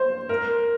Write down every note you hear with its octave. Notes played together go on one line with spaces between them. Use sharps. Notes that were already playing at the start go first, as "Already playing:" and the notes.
Already playing: C5
A#4